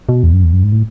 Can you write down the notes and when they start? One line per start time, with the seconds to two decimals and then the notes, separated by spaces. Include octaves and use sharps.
0.09 B2
0.23 E2
0.33 F#2
0.43 E2
0.53 F#2
0.63 G#2
0.72 A2